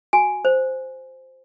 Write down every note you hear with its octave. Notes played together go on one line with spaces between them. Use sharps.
F#4 G#5
C5